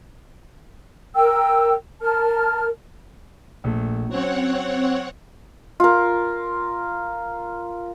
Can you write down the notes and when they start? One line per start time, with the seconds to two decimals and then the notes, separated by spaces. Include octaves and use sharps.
1.15 A#4 G5 E6
2.01 A#4 A5 F6
3.64 A#1 A3
4.09 F#3 C4 C#4 C#5 F#5
5.80 F4 A#4